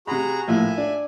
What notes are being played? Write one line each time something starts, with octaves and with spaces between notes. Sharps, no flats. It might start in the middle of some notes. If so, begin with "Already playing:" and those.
C3 F#4 G#4 A#5 B5
A#1 A2 E5 G#5
D4